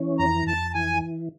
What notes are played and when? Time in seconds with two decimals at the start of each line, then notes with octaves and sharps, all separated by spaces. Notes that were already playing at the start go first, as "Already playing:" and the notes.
Already playing: E3 C#4
0.19 F2 A#5
0.47 F2 A5
0.74 E3 G#5